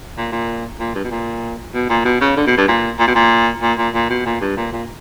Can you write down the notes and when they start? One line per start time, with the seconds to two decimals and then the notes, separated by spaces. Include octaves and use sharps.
0.17 A#2
0.32 A#2
0.80 A#2
0.95 G2
1.04 B2
1.11 A#2
1.74 B2
1.89 A#2
2.05 B2
2.21 C#3
2.37 D3
2.47 B2
2.57 G2
2.68 A#2
3.00 A#2
3.08 B2
3.15 A#2
3.62 A#2
3.78 A#2
3.94 A#2
4.10 B2
4.26 A#2
4.41 G2
4.57 A#2
4.73 A#2